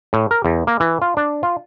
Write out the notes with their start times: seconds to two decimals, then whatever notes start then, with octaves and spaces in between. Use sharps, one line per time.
0.13 A2
0.31 A#4
0.45 E2
0.67 A#3
0.80 E3
1.02 F4
1.17 D4
1.43 F4